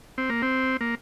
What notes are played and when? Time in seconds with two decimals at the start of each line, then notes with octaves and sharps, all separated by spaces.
0.18 C4
0.30 A#3
0.42 C4
0.81 A#3